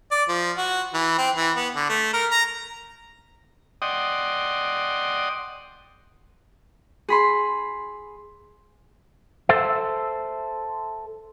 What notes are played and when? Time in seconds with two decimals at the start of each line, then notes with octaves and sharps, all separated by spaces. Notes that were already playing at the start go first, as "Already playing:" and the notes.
0.11 D5
0.28 F3
0.57 F#4
0.94 E3
1.18 C4
1.35 E3
1.56 B3
1.75 D3
1.89 A3
2.13 A#4
2.31 A#5
3.82 D5 D#5 F#5 G5 C6 D#6
7.08 G#4 B5 C6
9.49 A4 C5 E5